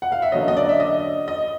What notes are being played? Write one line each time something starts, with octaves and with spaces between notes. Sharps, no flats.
F#5
F5
E5
D3 F#3 A#3 C#4 D#5
D#5
D5
E5
D#5
D#5